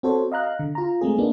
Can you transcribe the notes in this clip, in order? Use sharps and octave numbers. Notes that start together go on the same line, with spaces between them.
C4 F#4 A4 C5 C#5
D#5 F5 A#5 F#6
D3
F4 A#5
G#3 A3 C4 G#4
A#3 B3 D4 D#4